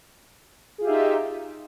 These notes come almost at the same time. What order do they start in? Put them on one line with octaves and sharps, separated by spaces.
G#4 F4 G4 E5 D#4